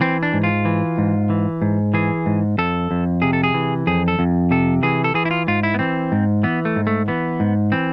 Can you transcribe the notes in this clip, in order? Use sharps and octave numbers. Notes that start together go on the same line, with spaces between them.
E3 C4
D4
G#2
F4
E3
G#2
E3
G#2
E3 G#4
G#2
F2 A4
F2
C3 G#4
A4
G#4
E3
F2 G#4
A4
F2
C3 A4
E3 G#4
A4
E3 G#4
E4
F4
G#2 F4
E4
B3
E3 C4
G#2
E3 B3
A3
G#2
A3
E3 B3
G#2
E3 C4